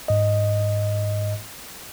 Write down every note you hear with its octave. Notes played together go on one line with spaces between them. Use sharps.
G#2 D#5